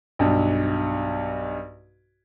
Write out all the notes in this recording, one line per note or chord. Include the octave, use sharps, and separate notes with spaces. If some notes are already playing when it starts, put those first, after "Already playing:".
B1 G2